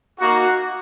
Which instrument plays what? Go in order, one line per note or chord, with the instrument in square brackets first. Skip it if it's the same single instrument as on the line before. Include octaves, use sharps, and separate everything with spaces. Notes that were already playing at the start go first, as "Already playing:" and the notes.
[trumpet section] A#3 D#4 F#4